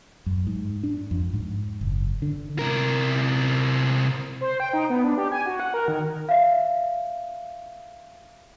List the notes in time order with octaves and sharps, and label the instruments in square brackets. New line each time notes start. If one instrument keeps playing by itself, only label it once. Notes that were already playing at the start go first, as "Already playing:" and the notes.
[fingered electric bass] F#2
G#2
D4
F2
G#2
F#1
D3
[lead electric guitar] C3 A#4
[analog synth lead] C5
G5
D#4
B3
D4
G4
G#5
F#4
F#5
A#4
D#3
[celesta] E5 F5